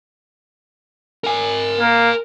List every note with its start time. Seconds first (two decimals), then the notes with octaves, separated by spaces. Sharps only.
1.24 A#4 G#5
1.80 A#3